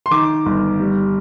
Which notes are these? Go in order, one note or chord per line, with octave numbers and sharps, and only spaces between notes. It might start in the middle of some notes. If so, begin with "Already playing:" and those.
C6
D#3 D6
G1
G3